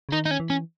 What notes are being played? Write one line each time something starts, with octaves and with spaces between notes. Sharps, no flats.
C#3
D#3 D#4
D#4
C#4
E3
C#4